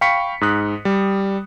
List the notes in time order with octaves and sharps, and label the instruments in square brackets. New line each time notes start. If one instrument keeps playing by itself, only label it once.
[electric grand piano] F5 G5 B5 C#6 B6 C#7
G#2 D#6 F#6
G3